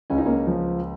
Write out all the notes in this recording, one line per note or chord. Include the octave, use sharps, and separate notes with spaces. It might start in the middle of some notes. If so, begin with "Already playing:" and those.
C#2 C#4
D#4
A#3 C#4
F3